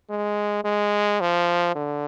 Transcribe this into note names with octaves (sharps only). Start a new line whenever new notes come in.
G#3
G#3
F3
D3